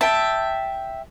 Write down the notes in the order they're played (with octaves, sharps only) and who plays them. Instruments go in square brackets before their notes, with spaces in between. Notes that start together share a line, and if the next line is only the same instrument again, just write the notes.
[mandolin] E5 G5 [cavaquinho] A5